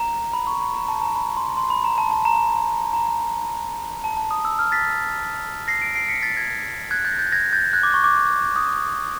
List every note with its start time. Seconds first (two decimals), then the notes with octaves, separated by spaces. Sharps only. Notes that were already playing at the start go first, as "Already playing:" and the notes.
Already playing: A#5
0.33 B5
0.47 C#6
0.61 B5
0.75 A#5
0.88 A5
1.02 A#5
1.16 B5
1.37 C6
1.57 C6
1.70 B5
1.84 A#5
1.98 A5
2.11 A5
2.25 A#5
2.93 A#5
4.04 A5
4.17 A5
4.31 D#6
4.45 E6
4.59 F6
4.72 A6 B6
5.68 A#6 C7
5.82 C7 D7
5.95 C7 D7
6.08 B6 C#7
6.22 A6 B6
6.37 G#6 A#6
6.91 F#6 G#6
7.05 G6 A6
7.12 A#6
7.19 G6 A6
7.32 G#6 A#6
7.53 G6 A6
7.73 F#6 G#6
7.83 D6
7.94 C#6
8.04 D6
8.56 D#6